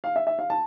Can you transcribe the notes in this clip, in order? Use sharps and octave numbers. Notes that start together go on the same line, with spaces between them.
F5
E5
E5
F5
A5